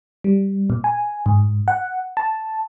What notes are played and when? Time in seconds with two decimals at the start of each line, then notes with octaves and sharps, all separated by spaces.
0.24 G3
0.70 A#2
0.84 G#5
1.26 G#2
1.68 F#5
2.17 A5